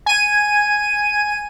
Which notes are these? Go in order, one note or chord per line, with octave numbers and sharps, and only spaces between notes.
G#5 D#7